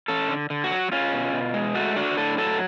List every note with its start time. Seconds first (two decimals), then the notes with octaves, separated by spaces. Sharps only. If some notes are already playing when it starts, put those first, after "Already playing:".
0.08 C#4 A4
0.29 D3
0.50 D3
0.64 F#4
0.71 F#3
0.92 C#4 F4
1.13 B2
1.33 B2
1.54 G#3
1.75 A3 F#4
1.96 D4 F#4
2.17 A2 A4
2.38 F#3 A4